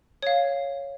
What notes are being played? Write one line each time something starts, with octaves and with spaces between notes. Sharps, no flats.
C#5 F5